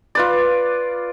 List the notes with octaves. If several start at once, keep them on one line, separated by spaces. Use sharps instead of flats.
F4 B4 D5